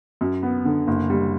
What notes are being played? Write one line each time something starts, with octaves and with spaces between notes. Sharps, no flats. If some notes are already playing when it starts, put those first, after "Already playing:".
F#2
B3
D3
F#1
G3